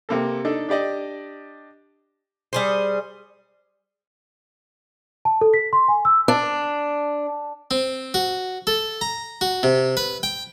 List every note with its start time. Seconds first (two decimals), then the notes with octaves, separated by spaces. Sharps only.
0.09 C3 A#3 A4
0.45 D4 D#4 A4
0.69 D4 G4 D5 D#5
2.53 G3 G#4 C5
5.25 A5
5.41 A4
5.54 B6
5.73 C6
5.88 G#5
6.05 E6
6.28 D4
7.71 C4
8.14 F#4
8.67 A4
9.01 A#5
9.41 F#4
9.63 C3
9.97 B4
10.23 G5